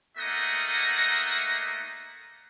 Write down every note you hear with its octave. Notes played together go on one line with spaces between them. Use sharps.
A3 A#3 D#4 D#5 F#5